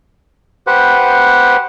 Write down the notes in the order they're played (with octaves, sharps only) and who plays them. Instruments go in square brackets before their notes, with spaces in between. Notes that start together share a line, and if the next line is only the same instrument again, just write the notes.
[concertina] G4 B4 C5 F#5